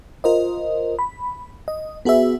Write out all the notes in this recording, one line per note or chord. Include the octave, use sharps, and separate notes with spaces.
F4 A#4 C5 D#5
B5
D#5
B3 F#4 G#4 B4 E5